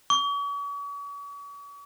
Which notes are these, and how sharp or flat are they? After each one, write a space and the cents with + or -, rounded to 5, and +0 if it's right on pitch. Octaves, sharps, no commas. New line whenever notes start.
C#6 +45